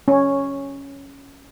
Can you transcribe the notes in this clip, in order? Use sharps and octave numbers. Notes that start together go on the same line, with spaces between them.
C#4